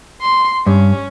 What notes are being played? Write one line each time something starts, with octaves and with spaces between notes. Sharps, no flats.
C6
G2 C#4